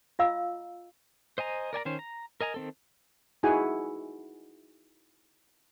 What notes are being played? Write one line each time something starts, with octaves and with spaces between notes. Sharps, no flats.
F4 D#5 F5 A#5 E6
C5 D#5 G#5 A#5
A#4 D5 G#5 A#5
D#3 C#4 C5
A#5
A#4 D#5 G#5 A#5
D#3 C4 A4
D#4 E4 F#4 G#4 F#5 G#5